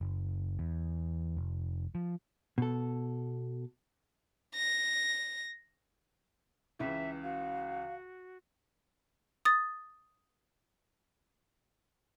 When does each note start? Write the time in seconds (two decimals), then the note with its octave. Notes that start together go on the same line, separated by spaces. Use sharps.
0.01 F#1
0.59 E2
1.37 F1
1.95 F3
2.58 B2 A4
4.54 A#6
6.79 C#2 C#3 E3 E5
7.23 F#4 F5
9.45 D#6 A6